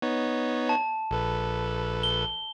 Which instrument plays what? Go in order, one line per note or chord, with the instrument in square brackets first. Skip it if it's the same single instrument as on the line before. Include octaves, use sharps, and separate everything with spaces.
[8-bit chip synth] B3 D#4 C#5
[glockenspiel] A5
[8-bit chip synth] A#1 A4 B4
[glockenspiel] G7